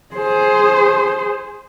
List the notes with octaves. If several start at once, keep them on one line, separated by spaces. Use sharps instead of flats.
G#4 C5